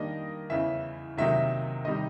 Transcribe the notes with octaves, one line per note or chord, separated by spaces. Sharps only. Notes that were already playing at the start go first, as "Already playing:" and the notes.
Already playing: D#3 G3 A#3 D4 D#5
E2 C#3 E3 E5
C3 D#3 F#3 A#3 D#4 E5
C3 D#3 G3 D#5